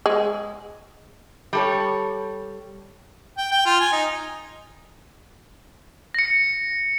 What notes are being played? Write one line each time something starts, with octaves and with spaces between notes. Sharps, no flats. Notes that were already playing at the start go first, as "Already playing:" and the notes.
G#3
G3 A4 C#5
G5
G5
F4
G#5
D#4
A#6 C#7